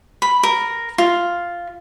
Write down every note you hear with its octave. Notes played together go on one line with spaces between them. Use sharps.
B5
A#4
F4